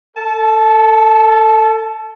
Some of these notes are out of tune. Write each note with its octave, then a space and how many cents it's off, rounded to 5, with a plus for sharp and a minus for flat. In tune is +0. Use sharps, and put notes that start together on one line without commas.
A4 +25 A5 -20